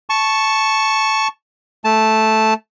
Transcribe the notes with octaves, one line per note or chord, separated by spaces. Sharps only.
A5 C#6
A3 A5